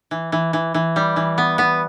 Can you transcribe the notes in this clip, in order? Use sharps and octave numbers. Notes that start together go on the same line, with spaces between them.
E3
E3
E3
E3
G3
E3
B3
B3